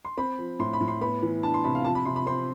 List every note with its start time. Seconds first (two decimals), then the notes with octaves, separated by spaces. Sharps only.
0.05 C6
0.17 C4 B5
0.39 F3
0.59 A2 C6
0.73 B5
0.81 A2
0.88 C6
1.01 B3 B5
1.22 E3
1.43 D4 A5
1.54 C6
1.64 C3 B5
1.75 F5
1.85 F3 A5
1.95 B5
2.05 C3 C6
2.16 B5
2.27 C4 C6